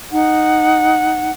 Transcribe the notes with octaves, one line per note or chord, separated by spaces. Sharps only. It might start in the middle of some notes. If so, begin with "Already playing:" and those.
D#4 F#5